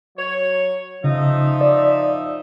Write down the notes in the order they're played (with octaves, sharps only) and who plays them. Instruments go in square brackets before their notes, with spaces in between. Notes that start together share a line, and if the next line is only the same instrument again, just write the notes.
[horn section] F#3 C#5
[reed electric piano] C#3 [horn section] F3 D#4 E5
[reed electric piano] D5